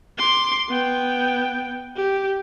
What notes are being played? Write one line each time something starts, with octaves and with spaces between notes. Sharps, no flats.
C6 D6
B3 G5
G4